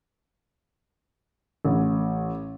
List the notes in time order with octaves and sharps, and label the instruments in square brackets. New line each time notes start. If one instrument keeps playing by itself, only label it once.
[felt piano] A1